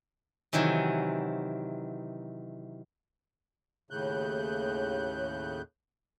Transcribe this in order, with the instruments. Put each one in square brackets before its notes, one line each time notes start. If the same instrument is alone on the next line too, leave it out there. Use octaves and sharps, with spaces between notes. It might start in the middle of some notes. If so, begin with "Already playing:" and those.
[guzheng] C3 D#3 E3 F#3
[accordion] D#2 A2 C#3 F#6 G6